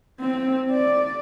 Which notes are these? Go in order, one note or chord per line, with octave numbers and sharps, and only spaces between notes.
C4
D5